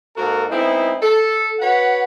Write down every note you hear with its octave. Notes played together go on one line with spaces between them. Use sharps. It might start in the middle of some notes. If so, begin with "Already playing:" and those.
G#2 A#3 F#4 A4 A#4
G#3 B3 C4 D#4 E4
A4
F#4 B4 C#5 F#5